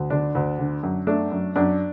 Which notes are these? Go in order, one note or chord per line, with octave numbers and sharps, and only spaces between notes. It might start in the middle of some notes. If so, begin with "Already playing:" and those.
Already playing: D2
D3 D4
D2
D3
F#2
A3 D4
F#2
F#2 D4